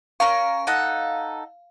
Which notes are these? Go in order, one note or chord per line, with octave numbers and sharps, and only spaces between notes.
C#4 A#4 F5 C#6
D#4 A4 F#5